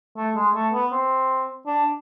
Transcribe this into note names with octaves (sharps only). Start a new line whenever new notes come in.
A3
G#3
A3
B3
C4
D4